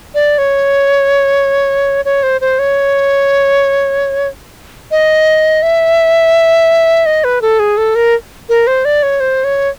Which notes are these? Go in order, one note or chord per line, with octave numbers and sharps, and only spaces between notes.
D5
C#5
C#5
C5
C5
C#5
D#5
E5
D#5
B4
A4
G#4
A4
A#4
A#4
C5
D5
C#5
C5
C#5